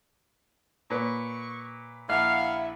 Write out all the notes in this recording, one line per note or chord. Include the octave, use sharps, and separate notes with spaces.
A#2 B4 C#5 C#6
A#1 E4 F5 F#5